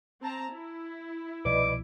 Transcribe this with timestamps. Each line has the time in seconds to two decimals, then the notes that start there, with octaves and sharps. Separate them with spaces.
0.21 C4 A5 A#5
0.51 E4
1.45 C2 B2 F3 B4 D5 D#5 D6